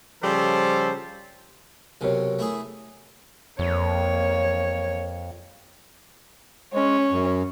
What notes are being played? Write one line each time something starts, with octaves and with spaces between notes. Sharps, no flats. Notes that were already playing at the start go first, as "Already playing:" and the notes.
C#3 F3 G3 A4 C5
B1 C3 A#4 C#5
A3 E4 G#4
F2 A#3 C#5
G#3 C#4 C#5
F#2